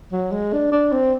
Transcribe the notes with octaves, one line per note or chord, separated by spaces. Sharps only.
F#3
G#3
D4
D4
C4